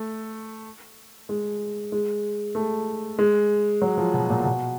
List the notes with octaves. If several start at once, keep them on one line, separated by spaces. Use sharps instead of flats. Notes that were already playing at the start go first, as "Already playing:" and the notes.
Already playing: A3
G#3
G#3
A3
G#3
F#3
F3
B2
A#2
B2